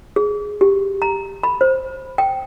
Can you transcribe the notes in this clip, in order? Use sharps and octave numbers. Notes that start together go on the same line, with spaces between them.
G#4
G4
A#5
B5
C5
G5